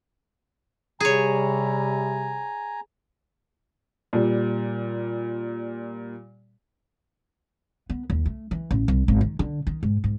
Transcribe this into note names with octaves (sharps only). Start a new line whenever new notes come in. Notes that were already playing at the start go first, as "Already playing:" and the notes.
C3 G3 G#4 C#5 G#5 A#5
A#2 G3
B3
D#2
A3
E3
A1
C2
G#1
D#3
D3
D#3
G#2
G#2